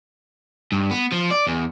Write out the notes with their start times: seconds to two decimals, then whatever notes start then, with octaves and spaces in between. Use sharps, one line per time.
0.72 G2
0.91 B3
1.13 F3
1.31 D5
1.48 E2